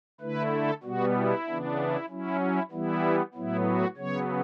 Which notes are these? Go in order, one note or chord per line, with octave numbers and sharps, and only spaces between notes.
D3 A3 E4 B4
A4
B2 G3 B3 F#4
E4
C#3 E3 B3 D4
E4
F#3 C#4 E4
E4
E3 G3 B3 E4
A2 F#3 B3 E4
F#4
C#3 F#3 B3 C#5